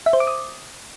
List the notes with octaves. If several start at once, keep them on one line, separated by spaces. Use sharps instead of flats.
E5
C5
D6
D#6